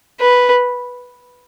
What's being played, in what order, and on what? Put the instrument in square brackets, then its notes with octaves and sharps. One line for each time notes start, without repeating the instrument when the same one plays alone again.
[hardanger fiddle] B4